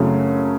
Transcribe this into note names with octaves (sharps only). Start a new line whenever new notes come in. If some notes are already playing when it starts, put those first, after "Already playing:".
Already playing: F#2 C#3 F#3 A3 C#4